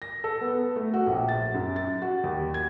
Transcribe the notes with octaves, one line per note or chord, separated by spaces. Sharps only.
A#6
A4
B3
A3
F#4
A#1
A6
F#2
A6
F#4
D#2
G#6